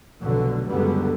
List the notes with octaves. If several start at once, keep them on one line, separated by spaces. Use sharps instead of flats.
F1 B1 B2 D3 F#3
C#2 F#2 D3 G3 B3